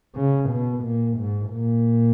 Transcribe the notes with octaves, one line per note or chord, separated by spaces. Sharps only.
C#3
B2
A#2
G#2
A#2